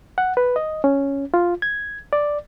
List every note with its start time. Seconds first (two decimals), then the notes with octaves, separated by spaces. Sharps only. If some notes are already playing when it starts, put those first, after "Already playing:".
0.18 F#5
0.37 B4
0.56 D#5
0.84 C#4
1.34 F4
1.62 G#6
2.13 D5